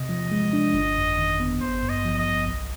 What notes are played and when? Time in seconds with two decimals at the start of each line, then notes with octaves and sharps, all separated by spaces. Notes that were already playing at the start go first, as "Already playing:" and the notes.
Already playing: C3 D#5
0.09 F3
0.32 G#3
0.53 D4
0.74 G1
0.96 F2
1.18 D#3
1.40 B3
1.61 G#1 C5
1.82 G2
1.90 D#5
2.05 F3
2.19 D#5
2.27 G#1
2.48 C2